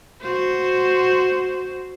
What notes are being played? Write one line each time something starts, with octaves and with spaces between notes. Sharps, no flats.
F#4 C5